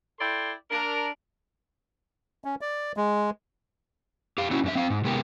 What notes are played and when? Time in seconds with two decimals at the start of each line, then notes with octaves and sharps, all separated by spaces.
0.20 E4 A4 D5 G5 C6
0.70 D4 A#4
2.44 C#4
2.61 D5
2.97 G#3
4.38 G4 F5
4.51 C#4 D4 E4 F#4
4.64 F#2 D4 E5
4.76 C4 F5
4.90 G#2
5.04 C3 G#3 B3 G4 A#4